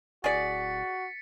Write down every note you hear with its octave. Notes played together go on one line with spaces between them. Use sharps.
D1 F#4 G#4 D5 A6 B6 C#7